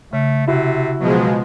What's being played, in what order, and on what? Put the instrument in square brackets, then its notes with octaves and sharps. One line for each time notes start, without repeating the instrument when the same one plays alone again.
[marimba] C#3 [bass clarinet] A3
[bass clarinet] C3 [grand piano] E4 F#4
[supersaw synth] B2 F3 G#3 [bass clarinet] F#3